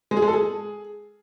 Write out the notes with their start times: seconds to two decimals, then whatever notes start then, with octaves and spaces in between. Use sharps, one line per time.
0.11 G#3
0.17 G#4
0.22 G#3
0.28 A4
0.33 G#4